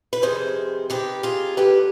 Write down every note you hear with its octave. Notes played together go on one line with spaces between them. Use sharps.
B4
F2 C3 D#3 G#4 C5
F2 C3 D#3 G4 B4
F4 G#4
D#2 D3 G4 B4